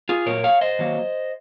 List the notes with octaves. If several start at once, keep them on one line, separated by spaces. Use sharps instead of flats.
F4 G#4
A#2 F#3 A#3 A#4 C#5
C#5 F5
C5 D#5
D#3 F#3 A#3